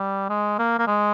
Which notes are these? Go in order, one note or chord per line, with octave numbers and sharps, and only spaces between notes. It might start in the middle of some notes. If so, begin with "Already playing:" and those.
Already playing: G3
G#3
A#3
A#3
G#3